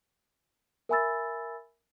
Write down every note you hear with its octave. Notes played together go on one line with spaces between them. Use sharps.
A#4 E5 G#5 B5 E6 A6